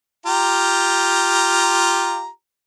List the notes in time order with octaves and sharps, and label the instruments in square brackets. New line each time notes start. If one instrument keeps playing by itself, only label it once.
[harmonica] F4 G4 A#5